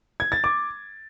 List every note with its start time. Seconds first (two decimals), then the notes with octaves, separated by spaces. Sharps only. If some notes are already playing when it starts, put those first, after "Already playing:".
0.20 G#6
0.32 A6
0.44 D6